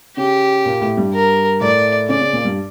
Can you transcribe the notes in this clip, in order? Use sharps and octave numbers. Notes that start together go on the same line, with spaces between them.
C#3 C#4 G4
A#2 A#3
A2 A3
G2 G3
A#4
A2 A3 D5
C#3 C#4 D5
C#3 C#4
A#2 A#3
G2 G3